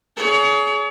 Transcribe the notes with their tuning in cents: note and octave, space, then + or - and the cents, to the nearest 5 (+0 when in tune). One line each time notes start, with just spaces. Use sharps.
G#4 +30 C#5 +35